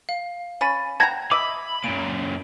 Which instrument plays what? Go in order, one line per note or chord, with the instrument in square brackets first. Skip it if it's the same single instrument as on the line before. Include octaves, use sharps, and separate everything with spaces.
[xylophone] F5
[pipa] C#4 B5 [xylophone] A6 D#7
[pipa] F#5 G5 A#5 [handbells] A5 G#6 A#6
[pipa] D#5 E5 [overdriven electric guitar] B5 [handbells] D6
[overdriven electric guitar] F#2 A#2 [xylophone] D7